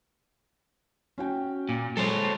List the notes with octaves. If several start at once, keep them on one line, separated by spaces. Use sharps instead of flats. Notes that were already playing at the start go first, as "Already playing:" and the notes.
C#4 F#4 G5
A#2
G#3 A4 C5 C#5